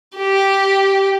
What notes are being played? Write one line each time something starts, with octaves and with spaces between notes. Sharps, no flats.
G4